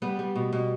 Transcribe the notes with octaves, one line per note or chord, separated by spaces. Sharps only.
G3 B3
G3
B2
B2